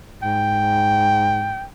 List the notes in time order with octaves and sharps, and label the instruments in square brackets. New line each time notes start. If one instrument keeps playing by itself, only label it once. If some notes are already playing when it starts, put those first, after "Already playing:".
[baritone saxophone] G#2 [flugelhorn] G5